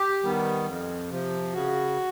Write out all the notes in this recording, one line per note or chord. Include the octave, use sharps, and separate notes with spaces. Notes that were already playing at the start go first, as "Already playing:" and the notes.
Already playing: G4
D#3 G3 B3
F2
C3 F3
C#3 F#4